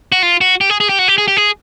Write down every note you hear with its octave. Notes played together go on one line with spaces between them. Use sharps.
F#4
F4
F#4
G4
G#4
G#4
G4
F#4
G4
G#4
G4
G#4